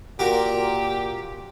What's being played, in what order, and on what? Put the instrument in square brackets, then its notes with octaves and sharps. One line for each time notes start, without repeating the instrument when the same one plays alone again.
[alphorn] A#2 [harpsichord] F#4 A#4 [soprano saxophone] G4